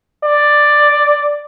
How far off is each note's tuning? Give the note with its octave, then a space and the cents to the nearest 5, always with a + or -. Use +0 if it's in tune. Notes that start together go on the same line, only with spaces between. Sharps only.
D5 +5